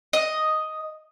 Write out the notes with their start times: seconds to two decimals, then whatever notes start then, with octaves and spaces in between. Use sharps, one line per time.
0.13 D#5